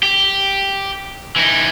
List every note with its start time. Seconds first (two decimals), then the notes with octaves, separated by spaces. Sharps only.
0.03 G4
1.36 E3 D#4